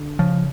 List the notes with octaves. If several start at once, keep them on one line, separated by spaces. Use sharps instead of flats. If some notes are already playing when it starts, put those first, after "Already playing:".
Already playing: D3
C#3 F3